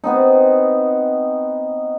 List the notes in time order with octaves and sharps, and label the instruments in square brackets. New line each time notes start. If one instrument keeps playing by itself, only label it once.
[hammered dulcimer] B3 C4 D#4